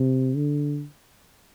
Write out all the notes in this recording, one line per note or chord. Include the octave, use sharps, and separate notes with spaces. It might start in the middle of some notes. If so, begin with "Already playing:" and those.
Already playing: C3
D3